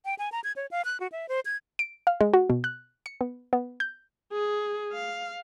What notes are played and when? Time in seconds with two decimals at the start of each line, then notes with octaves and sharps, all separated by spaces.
0.05 G5
0.19 G#5
0.32 A#5
0.44 G#6
0.56 C#5
0.71 F5
0.85 F#6
1.00 F#4
1.12 E5
1.29 C5
1.45 G#6
1.79 D7
2.07 F5
2.21 G#3
2.34 F#4
2.50 B2
2.64 F#6
3.06 C#7
3.21 B3
3.53 B3
3.80 G6
4.32 G#4
4.92 F5